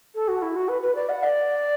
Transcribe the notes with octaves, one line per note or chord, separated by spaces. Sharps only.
A4
F#4
E4
F#4
B4
B4
D5
F#5
D5